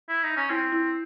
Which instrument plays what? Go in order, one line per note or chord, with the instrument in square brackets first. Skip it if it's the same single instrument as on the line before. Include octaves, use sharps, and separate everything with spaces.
[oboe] E4
D#4
C#4
[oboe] C4 [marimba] E4
[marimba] E4